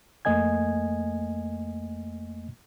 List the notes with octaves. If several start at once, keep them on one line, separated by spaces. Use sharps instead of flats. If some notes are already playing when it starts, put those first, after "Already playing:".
F2 A3 A#3 D#5 G#5 G#6